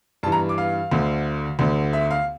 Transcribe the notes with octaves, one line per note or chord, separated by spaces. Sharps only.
G2 E3 A5
A#5
D6
F5
D2 D3
D2 D3
E5
F5